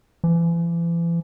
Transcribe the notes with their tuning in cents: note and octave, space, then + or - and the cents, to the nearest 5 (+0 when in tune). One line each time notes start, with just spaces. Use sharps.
E3 +40